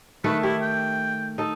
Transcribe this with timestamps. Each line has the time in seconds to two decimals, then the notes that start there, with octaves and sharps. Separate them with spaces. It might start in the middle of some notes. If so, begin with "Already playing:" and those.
0.24 D#3 A3 A4 B4
0.43 E4 G4
0.62 G5
1.38 D#4 A4